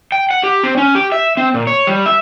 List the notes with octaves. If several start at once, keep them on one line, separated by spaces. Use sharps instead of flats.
G5
F#5
G4
C4
C#4
G4
E5
C4
A#2
C#5
G3
E5